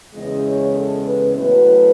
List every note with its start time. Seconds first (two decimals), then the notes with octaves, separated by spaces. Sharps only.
0.14 E2 C#3 G#3 D#5
0.45 C#5
0.75 A4
1.05 B4
1.35 A2 F#3 B3 B4